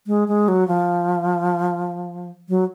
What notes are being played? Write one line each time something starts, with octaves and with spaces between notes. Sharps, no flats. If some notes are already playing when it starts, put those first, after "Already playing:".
G#3
G#3
F#3
F3
F#3